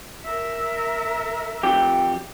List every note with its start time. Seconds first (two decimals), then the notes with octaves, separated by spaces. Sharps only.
0.24 A#4 E5
1.63 F2 G4